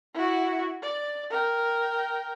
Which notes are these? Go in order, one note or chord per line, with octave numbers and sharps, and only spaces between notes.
E4 F#4
D5
A#4 G5